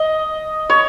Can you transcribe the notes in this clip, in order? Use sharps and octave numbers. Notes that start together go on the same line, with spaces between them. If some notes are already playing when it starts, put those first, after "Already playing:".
Already playing: D#5
C#5